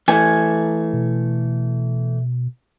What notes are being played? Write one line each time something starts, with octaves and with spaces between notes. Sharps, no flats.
E3 A3 G#5
B2